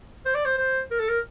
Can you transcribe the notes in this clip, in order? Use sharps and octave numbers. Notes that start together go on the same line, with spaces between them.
C5
D5
C5
C5
A#4
A4
A#4